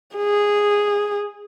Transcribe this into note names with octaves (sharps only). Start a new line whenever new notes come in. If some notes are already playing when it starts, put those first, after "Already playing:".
G#4